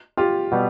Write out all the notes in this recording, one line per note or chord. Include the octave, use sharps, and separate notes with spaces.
F4 G4
B2 G3 B3